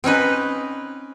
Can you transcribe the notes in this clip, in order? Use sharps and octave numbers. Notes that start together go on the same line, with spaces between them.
C4 C#4 D#4 B4